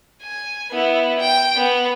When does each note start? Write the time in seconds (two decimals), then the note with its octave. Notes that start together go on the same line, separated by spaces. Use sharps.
0.23 G#5
0.71 B3 E4
1.19 G5
1.57 B3